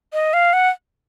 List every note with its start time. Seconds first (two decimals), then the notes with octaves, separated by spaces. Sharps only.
0.13 D#5
0.33 F5
0.53 F#5